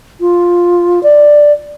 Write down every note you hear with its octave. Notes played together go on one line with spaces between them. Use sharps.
F4
D5